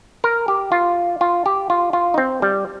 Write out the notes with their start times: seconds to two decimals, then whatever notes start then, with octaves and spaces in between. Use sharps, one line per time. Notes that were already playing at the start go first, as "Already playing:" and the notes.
0.24 A#4
0.48 G4
0.72 F4
1.21 F4
1.46 G4
1.70 F4
1.93 F4
2.14 D#4
2.18 C4
2.42 G3